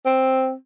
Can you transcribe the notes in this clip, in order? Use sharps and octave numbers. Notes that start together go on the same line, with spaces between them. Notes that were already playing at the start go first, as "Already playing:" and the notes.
C4